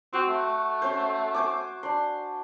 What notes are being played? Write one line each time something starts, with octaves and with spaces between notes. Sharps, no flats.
C4 F#4
A3
C#4 C5
C5 G#5 D6
D4 C6